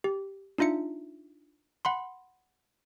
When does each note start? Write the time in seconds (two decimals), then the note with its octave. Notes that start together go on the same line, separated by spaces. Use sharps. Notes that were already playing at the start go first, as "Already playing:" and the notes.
0.04 G4
0.58 D4 D#4 F4 E5 C#7
1.85 F#5 B5 C6